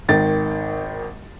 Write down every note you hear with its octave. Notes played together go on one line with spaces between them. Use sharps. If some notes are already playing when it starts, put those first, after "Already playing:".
G#1 D#3 A6